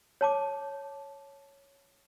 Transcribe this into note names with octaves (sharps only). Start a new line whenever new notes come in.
C#5 A5 D6